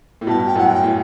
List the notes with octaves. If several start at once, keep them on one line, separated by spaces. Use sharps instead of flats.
A2
G2 B2 A5
G5
F#2 A2 F#5
G5
A2